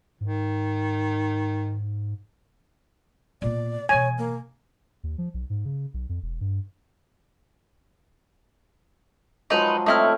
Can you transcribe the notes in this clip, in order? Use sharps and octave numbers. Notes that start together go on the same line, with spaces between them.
G#2 D#3
A#2 B3 D5
B2 E3 C#5 G#5
A#3
D#2
F3
B1
G#2
C#3
B1
F2
E1
G2
F3 F#3 G#3 D#4 B4
A3 C4 D#4 E4 C#5 F6